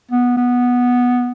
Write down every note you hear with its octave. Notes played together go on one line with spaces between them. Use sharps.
B3
B3